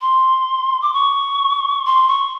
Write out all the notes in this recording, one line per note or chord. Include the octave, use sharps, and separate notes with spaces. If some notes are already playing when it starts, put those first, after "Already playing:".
C6
D6
C#6
C6
C#6